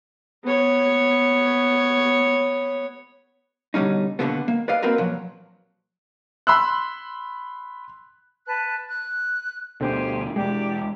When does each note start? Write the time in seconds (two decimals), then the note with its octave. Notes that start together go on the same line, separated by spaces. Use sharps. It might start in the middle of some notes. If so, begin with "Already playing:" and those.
0.44 B3 C#5
3.74 B2 D3 G3 C#4 D#4
4.19 D#2 B2 D3 E3 F3 B3
4.48 A#3
4.68 B4 D5 D#5 F5
4.82 A#3 C4 F#4 A#4 B4
4.98 A#2 F3 F#3
6.47 B5 C6 E6 F#6
8.46 B4 A5 F#6
8.89 F#6
9.81 D2 B2 D3 G4 C5 G#5
10.36 E1 G#3 G4 D5 D6